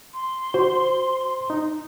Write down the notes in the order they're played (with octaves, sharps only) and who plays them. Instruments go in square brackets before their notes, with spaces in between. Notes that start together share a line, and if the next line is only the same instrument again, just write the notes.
[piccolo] C6
[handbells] F#4 [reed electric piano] C5
[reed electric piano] D#4